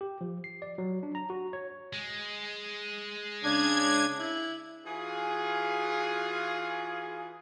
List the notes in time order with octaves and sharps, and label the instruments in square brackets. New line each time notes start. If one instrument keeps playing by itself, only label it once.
[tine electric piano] G4
F3
C7
D5
F#3
D4
A#5
F#4
C#5
[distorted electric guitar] G#3
[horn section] C#3 C#4 D4 [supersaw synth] G#6
[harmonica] E4
[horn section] E3 F4 F#4 G#4